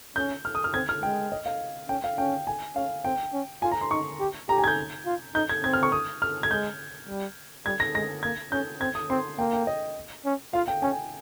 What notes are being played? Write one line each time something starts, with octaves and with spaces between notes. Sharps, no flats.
C#4 G6
F6
D#6
F6
C4 G#6
F6
G#3 G5
D#5
F5
C#4 G5
F5
C#4 G5
G#5
C#4 F5
C4 G5
C#4
F4 G#5
A#5
C6
D#4 C#6
G4
G4 A#5
G#5
G#6
G6
F4
D#4 G6
G#6
C4 G#6
F6
C#6
D#6
F6
G#6
G#3 G6
G3
G3 G#6
A#6
G#3 A#6
A#3 G#6
C#4 G6
C4 G#6
D#6
C4 C6
A#3 G5
G5
D#5
C#4
F4 F5
G5
C#4 G#5